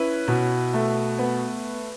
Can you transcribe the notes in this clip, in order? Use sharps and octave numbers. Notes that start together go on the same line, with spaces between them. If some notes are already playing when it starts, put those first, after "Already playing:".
Already playing: C#4 E4 B4
B2
A3
B3